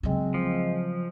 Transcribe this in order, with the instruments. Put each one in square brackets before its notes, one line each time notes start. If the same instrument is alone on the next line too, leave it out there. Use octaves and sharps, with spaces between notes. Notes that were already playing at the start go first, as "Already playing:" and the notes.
[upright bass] C#3 F#3 [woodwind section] G#3 C4
[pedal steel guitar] F3